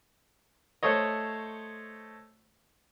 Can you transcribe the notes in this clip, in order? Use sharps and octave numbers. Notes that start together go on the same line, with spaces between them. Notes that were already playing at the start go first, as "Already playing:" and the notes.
A3 C5 C#5 D#5